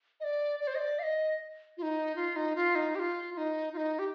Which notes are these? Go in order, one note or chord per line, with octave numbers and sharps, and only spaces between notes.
D#5
D5
D5
C5
D#5
D5
F5
D#5
F4
D#4
F4
D#4
F4
D#4
G4
F4
F4
D#4
F4
D#4
G4